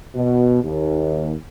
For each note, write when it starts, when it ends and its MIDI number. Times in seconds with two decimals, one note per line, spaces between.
0.15 0.62 47
0.63 1.32 39